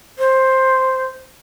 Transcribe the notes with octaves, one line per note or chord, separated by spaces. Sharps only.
C5